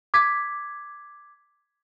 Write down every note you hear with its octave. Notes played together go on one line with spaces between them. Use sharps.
D6 G#6 B6